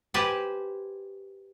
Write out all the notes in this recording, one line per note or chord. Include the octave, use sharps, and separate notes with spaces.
G4 B4 C5 G#5 A5